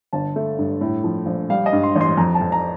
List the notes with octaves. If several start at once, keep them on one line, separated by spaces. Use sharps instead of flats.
G1 A5
A3
G2
A2
F3
A#1
G3 F5
D#5
G2
C6
A1
C6
F2 A#5
A5
F2
A#5